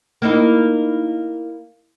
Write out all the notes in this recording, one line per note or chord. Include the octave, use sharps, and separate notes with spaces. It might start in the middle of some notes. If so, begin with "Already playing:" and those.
A#3 D#4 E4